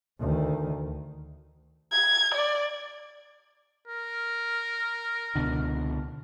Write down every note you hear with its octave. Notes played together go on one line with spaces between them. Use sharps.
D2 D#3
G#6
D5
A#4
C#2 B2 D3